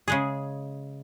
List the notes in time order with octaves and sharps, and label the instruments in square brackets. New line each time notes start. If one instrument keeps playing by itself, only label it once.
[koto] C#3 G#3 G#4